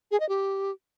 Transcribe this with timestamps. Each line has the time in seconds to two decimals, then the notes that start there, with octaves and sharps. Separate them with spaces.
0.11 G#4
0.20 D#5
0.29 G4